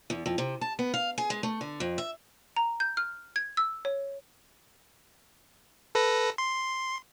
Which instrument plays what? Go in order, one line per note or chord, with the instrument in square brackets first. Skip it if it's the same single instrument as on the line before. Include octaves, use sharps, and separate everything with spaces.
[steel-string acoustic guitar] E2
F2
C3
A5
B3
F5
G#4
G#3
A3
D3
F2
E5
[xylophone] A#5
G6
F6
G#6
E6
C#5
[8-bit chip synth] A4 B4 A#6
C6